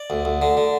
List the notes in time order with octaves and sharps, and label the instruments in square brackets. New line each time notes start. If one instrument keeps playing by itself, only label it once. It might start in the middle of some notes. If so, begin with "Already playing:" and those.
Already playing: [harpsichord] D5
D2
D2
D3
D3